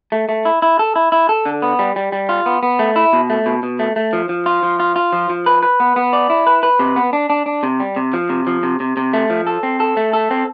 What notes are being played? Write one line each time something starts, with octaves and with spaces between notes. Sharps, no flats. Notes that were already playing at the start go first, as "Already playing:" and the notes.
A3
A3
E4
E4
A4
E4
E4
A4
D3
B3
G3
G3
G3
F4
B3
B3
A3
E4
B2
A3
B2
B2
A3
A3
F3
F3
F4
F3
F4
F4
F3
F3
B4
B4
B3
B3
D5
E4
B4
B4
C3
B3
D4
D4
D4
C3
G3
C3
F3
C3
F3
C3
C3
C3
A3
F3
A4
C4
A4
A3
A4
C4